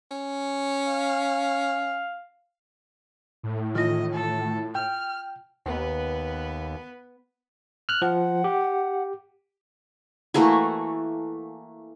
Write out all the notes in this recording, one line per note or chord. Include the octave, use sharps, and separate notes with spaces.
C#4
F5
A2
D#3 E3 F4 D#5 A#6
A4
G5 F6
D#2 B3 B4
F6 F#6
F3 F#5
G4
E3 A3 A#3 F#4